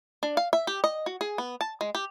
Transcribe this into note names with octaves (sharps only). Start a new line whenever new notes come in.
D4
F5
E5
G4
D#5
F#4
G#4
B3
A5
G#3
G4